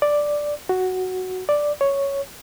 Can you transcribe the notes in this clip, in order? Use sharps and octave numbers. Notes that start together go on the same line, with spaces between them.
D5
F#4
D5
C#5